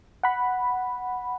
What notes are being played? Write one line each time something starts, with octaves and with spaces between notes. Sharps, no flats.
F#5 B5